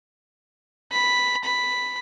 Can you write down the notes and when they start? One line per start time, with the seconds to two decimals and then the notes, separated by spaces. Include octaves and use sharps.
0.92 B5
1.44 B5